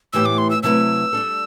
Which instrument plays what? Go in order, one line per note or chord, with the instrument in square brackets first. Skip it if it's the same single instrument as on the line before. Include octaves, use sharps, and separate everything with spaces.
[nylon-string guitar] A2 E3 B3 E4 G4 [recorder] E6
[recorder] D6
C6
E6
[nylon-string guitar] C3 F#3 A3 E4 B4 [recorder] E6
[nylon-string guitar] G3 D4 A4